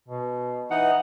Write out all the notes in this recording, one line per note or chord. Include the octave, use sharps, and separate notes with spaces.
B2
E3 D#4 F#5